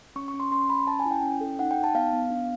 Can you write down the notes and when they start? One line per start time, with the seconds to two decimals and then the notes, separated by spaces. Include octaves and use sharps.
0.16 C#4 C#6
0.28 C#6
0.34 C#4
0.40 C6
0.52 C#4 C6
0.69 C#4 B5
0.87 C#4 A5
0.99 G#5
1.06 E4
1.11 G5
1.23 C#4
1.41 A4
1.59 D#4 F#5
1.71 G5
1.77 D#4
1.84 A5
1.95 B3 F5
2.13 B3
2.31 D4